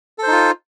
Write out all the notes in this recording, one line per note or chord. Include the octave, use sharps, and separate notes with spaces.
D#4 F4 A4 C5